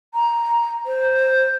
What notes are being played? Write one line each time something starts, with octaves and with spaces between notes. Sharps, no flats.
A#5
C5